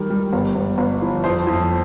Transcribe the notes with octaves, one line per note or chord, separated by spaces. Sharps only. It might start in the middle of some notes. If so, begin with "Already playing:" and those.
Already playing: D#3 G3 A#4
G3
G1
G1
G1
F3
F2 C5
F2